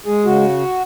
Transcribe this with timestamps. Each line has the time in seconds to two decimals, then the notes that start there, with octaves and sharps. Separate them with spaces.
0.06 G#3 G#4
0.25 C#3 F#4